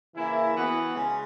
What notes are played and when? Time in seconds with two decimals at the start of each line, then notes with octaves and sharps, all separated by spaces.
0.14 C#3 E3 A#3 E4
0.54 E3 B3 F#4
0.94 C#3 G#3